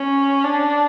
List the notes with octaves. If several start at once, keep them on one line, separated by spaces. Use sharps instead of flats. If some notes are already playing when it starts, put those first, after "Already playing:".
Already playing: C#4
D4